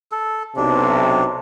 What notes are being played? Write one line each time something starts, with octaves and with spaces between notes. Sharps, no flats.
A4
B1 C3 D4